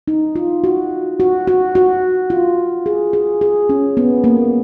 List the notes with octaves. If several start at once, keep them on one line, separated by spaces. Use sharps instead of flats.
D#4
F4
F#4
F#4
F#4
F#4
F4
G#4
G#4
G#4
C#4
B3
A#3